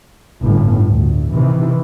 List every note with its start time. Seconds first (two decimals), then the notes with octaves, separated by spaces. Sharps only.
0.42 G1 A2 C#3
0.87 D2
1.33 C3 D#3 E3